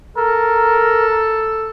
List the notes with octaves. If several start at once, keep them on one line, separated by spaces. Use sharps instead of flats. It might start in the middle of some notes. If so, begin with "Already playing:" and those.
A4 A#4